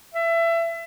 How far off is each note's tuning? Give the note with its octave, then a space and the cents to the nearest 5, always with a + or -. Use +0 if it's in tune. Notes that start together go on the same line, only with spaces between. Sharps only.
E5 +25